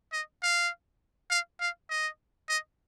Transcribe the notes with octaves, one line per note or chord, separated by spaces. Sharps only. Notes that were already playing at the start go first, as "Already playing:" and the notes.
D#5
F5
F5
F5
D#5
D#5